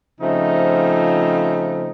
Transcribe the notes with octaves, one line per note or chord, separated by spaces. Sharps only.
C#3 F3 A3 C4 D#4